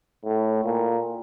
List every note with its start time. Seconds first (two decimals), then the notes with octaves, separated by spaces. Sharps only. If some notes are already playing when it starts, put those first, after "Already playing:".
0.24 A2
0.65 A#2